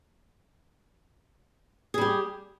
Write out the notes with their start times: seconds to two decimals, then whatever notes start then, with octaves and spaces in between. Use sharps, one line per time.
1.94 G#4
1.98 G3
2.01 G4